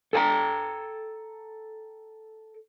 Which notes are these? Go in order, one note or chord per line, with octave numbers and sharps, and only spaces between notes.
A4 G5 G#5 A#5